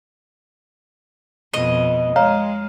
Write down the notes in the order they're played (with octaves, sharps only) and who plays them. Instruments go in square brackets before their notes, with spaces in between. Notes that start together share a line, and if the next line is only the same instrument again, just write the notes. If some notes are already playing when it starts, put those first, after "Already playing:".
[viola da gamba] F2 B2 [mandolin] D#5
[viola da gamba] G#3 [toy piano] C#5 A#5 [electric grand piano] F5